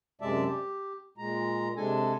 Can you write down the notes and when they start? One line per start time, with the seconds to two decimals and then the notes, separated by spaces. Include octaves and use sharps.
0.21 F#2 C3 G#3 D5 E5 A5
0.44 G4
1.18 A#2 G#3 A#5
1.77 C3 G#3 D4 A4 G#5